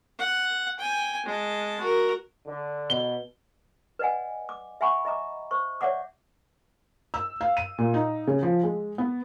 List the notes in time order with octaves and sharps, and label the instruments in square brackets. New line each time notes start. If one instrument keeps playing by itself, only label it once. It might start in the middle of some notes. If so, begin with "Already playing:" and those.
[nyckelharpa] F#5
G5 G#5
G#3 A5
F#4 A#4
[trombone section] D3
[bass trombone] B2 [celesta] G7
[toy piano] B4 D5 D#5 F#5 G#5
D6
E5 F#5 G#5 B5 C#6
D#5 E5 A#5 D6
C5 C#6
C#5 D5 E5 F#5 D6
[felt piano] E6
F5
D#7
A#2
D#4
C#3
F3
G#3
B3